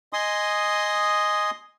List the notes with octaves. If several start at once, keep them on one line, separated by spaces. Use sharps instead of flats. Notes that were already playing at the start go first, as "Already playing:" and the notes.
D#5 G#5 C6 D#6